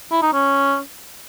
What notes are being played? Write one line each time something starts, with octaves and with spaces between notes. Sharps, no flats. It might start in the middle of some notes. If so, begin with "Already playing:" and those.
E4
D#4
C#4